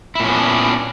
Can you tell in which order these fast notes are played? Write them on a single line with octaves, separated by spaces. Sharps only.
E4 A#2 C#4 B3 D4